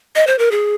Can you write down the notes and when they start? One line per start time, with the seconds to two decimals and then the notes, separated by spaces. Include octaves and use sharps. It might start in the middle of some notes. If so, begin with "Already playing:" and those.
0.16 D#5
0.27 C5
0.39 A#4
0.51 G#4